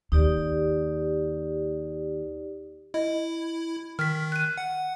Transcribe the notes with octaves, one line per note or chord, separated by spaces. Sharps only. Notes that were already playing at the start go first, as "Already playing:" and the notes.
D#2 D#4 G4 D5
E4 D#5
D#3 F6 B6
F#6 D#7
F#5